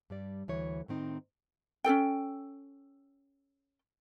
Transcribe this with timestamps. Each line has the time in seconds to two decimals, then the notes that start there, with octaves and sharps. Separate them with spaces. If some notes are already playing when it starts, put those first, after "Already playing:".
0.10 G2 G3 D5
0.48 D2 E3 C#5
0.88 A2 D#3 C4 D#4
1.84 C#4 G#4 A4 G5